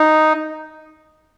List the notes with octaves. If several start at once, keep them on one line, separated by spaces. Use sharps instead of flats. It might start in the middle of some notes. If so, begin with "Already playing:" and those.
Already playing: D#4